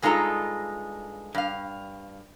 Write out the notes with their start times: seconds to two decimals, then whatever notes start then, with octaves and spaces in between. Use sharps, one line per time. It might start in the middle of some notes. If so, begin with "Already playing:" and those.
0.02 G2 G#3 D#4 F4 A4 A#5
1.34 G2 F5